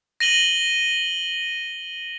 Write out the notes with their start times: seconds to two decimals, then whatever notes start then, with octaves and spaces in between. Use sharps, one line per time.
0.20 A#6 D#7 F#7 G7